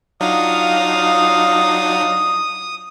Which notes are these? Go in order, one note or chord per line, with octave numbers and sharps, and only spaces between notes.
F#3 D4 D#4 F4 F5 D#6